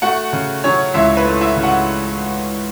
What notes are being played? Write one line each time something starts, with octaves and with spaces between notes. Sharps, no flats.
A3 F#4 F#5
C#3
F#3 C#4 C#5
C#2 E4 E5
B4
A3
E4 E5
C#3
F#4 F#5